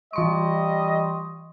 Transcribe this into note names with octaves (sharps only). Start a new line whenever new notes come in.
E3 G3 D#5 C6 C#6